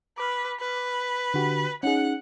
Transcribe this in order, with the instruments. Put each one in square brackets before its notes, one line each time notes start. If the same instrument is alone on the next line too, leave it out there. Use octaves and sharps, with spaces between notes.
[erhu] B4 [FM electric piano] D6 F6
[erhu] B4
[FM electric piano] D3 F#4 G4
[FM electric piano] C#4 D#4 G#4 [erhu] F#5